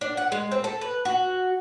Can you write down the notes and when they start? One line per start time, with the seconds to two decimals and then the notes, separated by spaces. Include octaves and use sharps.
0.01 D4
0.17 F#5
0.32 G#3
0.52 C4
0.64 A4
0.81 B4
1.05 F#4